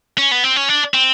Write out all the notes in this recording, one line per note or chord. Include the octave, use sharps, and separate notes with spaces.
C#4
B3
C4
C#4
D4
C4